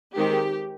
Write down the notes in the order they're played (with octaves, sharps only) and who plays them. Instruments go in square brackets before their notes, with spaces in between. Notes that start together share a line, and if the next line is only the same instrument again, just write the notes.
[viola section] D#3 G#3 C4 G4